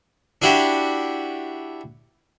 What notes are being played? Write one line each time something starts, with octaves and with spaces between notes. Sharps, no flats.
D4 E4 F#4 G4